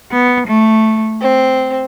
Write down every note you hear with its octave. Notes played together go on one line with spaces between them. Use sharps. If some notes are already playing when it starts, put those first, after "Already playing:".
B3
A3
C4